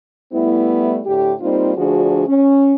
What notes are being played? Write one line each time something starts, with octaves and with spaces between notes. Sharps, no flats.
G3 A3 B3 E4
A2 D3 G4
G3 A#3 C4 D#4 F4
D2 F3 D4 F#4 G#4
C#4